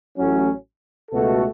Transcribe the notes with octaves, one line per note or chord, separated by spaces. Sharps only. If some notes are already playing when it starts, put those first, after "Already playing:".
A1 A2 F#3 C#4
C#2 B2 A3 F#4 A4